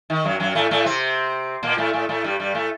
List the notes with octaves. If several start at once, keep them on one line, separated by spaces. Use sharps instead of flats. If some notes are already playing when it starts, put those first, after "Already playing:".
D#3
F#2 F#3
F#2 F#3
A2 A3
A2 A3
C3 C4
A#2 A#3
A2 A3
A2 A3
A2 A3
G2 G3
G2 G3
A2 A3